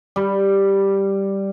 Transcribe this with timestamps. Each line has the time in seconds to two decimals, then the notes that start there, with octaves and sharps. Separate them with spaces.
0.16 G3